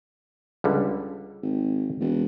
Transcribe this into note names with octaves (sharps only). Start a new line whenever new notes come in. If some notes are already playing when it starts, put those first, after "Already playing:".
C#2 D3 G3
G#1
E1